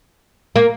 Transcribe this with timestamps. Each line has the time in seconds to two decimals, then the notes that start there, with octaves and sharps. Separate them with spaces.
0.56 A#3